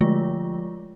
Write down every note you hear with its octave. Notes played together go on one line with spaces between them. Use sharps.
D3 F3 G#3 A3 F4